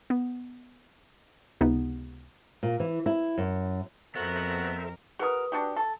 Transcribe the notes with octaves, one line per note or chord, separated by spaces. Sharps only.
B3
C#2 C3 B3 D#4
A#2
E3
E4
F#2
F2 B3 F#4 A4 A#4 C5 E5
F#4 G#4 A#4 B4 D#6
D4 F#4 G4
A4